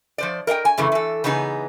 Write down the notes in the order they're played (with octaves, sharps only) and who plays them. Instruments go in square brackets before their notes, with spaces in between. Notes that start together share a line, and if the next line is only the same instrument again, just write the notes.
[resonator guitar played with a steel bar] F3 C5 D5
A#4 D#5 F5 G5
G#5
F#2 C#3 E3 A3
E3 A4
C#3 E3 B3 D#4 G#4